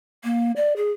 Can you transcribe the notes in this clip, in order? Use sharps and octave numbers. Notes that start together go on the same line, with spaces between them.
A#3
D5
G#4